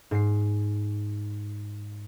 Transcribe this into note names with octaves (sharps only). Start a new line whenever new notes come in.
G#2 C7